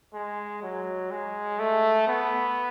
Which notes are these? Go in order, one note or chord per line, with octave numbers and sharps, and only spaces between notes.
G#3
F#3
G#3
A3
B3